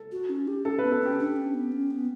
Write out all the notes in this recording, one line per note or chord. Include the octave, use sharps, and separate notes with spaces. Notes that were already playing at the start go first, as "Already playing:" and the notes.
Already playing: A4
F#4
C#4
G4
C#4 A4
B4
B3
A4
C#4 G4
D4
C#4
B3
C#4
B3